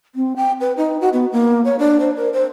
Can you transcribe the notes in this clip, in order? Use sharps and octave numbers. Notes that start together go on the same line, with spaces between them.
C4
G5
B4
D#4
F#4
B3
A#3
C#5
D4
C5
A#4
C5